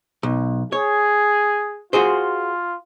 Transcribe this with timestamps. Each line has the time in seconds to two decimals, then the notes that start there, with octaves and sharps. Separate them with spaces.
0.23 B1
0.72 G#4 C#5
1.93 F4 F#4 G#4 C5